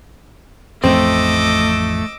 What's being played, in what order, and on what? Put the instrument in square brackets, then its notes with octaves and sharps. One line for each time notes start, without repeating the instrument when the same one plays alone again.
[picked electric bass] A1 F2 F3 [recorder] A3 [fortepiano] C4 [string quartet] D#5 D6 E6